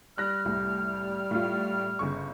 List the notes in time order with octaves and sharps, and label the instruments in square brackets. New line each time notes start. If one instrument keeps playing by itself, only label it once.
[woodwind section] G3 F6 [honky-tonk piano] F#6 A#6
[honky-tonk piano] C2 A2
A2 F4
G1 C#3 C#6